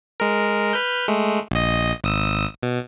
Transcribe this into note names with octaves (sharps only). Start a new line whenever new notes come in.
G#3 A#4
B4 F6 G6
G#3 A3
A#1 D#5
G#1 D#6 E6
B2